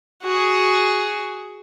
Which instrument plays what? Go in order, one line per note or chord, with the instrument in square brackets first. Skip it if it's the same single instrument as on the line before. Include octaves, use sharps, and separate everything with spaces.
[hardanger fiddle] F#4 G#4